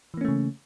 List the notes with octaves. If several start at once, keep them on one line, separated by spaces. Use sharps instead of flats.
C#3 E3 A3 A#3 C#4